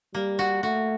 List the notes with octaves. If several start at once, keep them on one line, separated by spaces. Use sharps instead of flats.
G3 A#3
F#4
A3 F#4